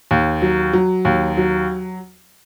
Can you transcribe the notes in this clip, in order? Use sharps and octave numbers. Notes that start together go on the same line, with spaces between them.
D#2
F#3
F#3
D#2
F#3